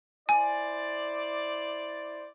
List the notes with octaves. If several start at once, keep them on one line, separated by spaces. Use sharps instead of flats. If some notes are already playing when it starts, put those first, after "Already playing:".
E4 C5 D5 G#5